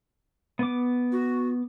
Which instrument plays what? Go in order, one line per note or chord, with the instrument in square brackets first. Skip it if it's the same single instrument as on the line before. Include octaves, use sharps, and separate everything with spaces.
[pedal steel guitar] B3 D6
[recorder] F#4